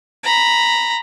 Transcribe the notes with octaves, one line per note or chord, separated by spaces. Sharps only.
A#5 B5